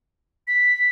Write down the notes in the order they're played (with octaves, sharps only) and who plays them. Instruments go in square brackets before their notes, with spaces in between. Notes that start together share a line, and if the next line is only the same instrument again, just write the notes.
[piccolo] B6